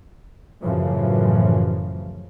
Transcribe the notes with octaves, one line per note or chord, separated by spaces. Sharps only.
F#2 A2 C#3 E3 F3